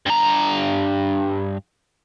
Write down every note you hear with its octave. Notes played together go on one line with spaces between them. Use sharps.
G2 A#5